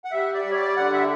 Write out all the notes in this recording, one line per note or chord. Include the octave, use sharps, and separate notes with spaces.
F#5
G3 E5
D5
G3
C#5
D5
D3 F#5
E5